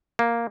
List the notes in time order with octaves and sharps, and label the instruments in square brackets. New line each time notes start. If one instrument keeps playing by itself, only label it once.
[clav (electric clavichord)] A#3